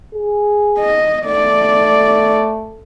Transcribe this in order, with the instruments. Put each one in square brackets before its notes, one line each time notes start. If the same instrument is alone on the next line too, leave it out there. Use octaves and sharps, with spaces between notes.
[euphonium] G#4
[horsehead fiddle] D#5
[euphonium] A3 [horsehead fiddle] D5